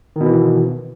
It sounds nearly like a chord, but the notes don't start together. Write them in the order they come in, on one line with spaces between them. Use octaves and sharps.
D#3 B2 E3